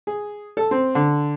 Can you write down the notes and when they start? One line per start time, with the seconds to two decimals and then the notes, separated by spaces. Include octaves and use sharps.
0.07 G#4
0.57 A4
0.71 C4
0.95 D3